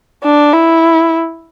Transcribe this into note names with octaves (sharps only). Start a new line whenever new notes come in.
D4
E4